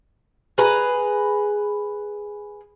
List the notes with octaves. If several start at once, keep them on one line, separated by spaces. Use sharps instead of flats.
G#4 B4 A#5